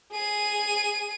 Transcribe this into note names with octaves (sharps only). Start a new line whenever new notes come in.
G#4 D#7